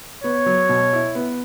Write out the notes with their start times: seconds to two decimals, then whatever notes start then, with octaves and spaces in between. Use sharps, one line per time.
0.24 B3 C#5
0.46 F#3
0.69 B2
0.93 E4
1.15 B3